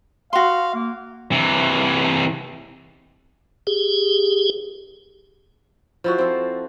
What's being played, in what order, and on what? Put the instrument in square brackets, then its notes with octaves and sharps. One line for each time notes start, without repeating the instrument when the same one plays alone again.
[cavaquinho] F#4 C6 [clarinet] F5
[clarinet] A#3
[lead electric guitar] C3 E3
[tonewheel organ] G4 G#4
[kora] F3 E4 F#4
C4 A4